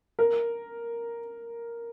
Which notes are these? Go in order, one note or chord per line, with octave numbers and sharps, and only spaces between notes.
A#4